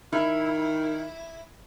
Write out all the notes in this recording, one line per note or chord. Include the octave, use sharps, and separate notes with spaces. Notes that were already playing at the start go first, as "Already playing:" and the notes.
D#3 E4